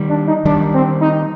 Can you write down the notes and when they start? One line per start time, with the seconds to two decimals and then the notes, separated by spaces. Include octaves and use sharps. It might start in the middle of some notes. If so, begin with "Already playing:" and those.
Already playing: D#3 G3
0.09 D4
0.27 D#4
0.45 D#3 G3 D4
0.74 C4
1.01 D#4